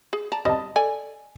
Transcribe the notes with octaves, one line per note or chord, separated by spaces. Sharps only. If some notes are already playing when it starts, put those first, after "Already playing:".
G#4
D5 A5 A#5
G3 D#5 A5
A4 D5 G#5